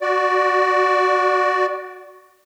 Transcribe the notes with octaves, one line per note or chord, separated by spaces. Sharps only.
F#4 D5